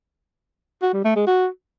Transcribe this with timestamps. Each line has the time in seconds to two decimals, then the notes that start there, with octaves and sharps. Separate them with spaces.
0.82 F#4
0.93 G3
1.05 A3
1.16 G#3
1.27 F#4